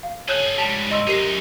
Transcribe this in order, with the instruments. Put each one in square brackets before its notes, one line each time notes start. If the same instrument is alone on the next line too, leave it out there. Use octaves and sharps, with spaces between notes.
[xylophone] F5
[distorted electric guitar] G#4 A4 [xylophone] C#5 F#6 G6
[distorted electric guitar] G#2 G3 [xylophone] A5
[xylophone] D#5 C6 E6
[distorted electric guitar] F#2 D#4 [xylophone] G4 A#4 C7